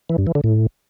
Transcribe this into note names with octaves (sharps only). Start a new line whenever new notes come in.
E3
G2
E3
D3
A2